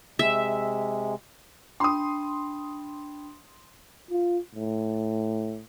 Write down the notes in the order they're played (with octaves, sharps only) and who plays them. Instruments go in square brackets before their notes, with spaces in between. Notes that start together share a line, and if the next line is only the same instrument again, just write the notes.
[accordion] C3 G#3 [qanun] E5
[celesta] D4 G5 B5 [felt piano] C6 D#6
[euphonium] F4
A2